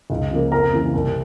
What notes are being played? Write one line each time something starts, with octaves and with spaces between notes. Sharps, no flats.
C#2
C#3 F3 A#3
F2 A#4 A#5
C#3 E3 A#3
C2